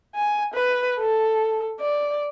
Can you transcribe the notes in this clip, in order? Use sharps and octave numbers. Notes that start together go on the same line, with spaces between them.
G#5
B4
A4
D5